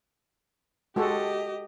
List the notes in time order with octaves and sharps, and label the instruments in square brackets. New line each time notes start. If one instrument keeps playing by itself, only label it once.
[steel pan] G#3 F#4 A4 [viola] G4 D#5